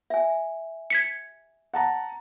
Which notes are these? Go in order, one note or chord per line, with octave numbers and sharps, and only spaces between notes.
E5 G#5
G#6 B6 C#7
F#5 A5 A#5